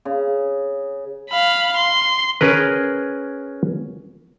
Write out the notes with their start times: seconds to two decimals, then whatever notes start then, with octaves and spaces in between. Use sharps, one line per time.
0.05 C#3
1.31 F5 B5
1.76 C6
2.41 C#4 G#4 A#4 B4